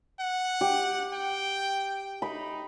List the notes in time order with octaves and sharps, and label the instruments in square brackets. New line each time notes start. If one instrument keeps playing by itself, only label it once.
[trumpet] F#5
[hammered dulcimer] G4
[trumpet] G5
[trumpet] D#4 [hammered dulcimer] B5